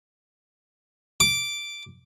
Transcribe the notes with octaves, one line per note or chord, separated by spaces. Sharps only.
D6